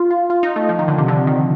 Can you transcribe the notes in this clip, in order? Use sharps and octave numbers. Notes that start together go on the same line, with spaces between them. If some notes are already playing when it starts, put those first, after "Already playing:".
Already playing: F4
F4
F4
D#4
A3
F3
D#3
D3
C3
D3
D#3